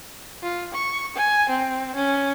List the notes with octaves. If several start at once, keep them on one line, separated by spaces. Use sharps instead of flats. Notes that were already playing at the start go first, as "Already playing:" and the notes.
F4
C#6
G#5
C4
C#4